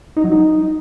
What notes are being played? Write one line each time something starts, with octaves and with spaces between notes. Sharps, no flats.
D#4
F#3
D#4